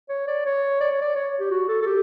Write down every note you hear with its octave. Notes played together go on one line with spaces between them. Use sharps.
C#5
D5
C#5
D5
C#5
D5
C#5
G4
F#4
A4
A4
G4